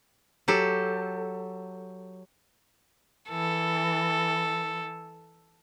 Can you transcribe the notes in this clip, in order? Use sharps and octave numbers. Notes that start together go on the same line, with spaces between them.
F#3 G4 A4
E3 A4